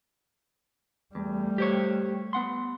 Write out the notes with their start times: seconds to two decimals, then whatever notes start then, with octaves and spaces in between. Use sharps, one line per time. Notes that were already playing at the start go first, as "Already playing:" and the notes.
1.15 E2 G3 A3
1.58 G4 C5 C#5
2.33 B3 F#5 C6